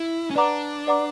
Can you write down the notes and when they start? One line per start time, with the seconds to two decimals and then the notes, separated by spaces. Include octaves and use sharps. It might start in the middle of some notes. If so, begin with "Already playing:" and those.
Already playing: E4
0.30 C#4
0.36 D4 B4 D5 F#5 A#5 D6
0.87 B4 D5 F#5 A#5 D6